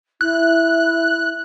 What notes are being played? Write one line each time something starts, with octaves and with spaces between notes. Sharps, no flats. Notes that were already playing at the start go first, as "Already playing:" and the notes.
E4 F#6